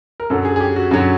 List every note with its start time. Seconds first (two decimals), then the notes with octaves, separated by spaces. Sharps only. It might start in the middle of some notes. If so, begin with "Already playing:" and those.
0.20 A#4
0.30 F#2 D3 F#3 A4
0.45 G#4
0.56 G#4
0.60 G4
0.76 F#4
0.91 F#2 D3 F#3